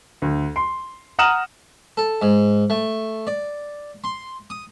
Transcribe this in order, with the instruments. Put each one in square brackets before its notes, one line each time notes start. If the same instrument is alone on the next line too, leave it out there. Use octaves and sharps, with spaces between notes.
[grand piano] D2
C6
F#5 A#5 D#6 F6 E7 F#7
[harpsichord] A4
G#2
A3
D5
C6
D#6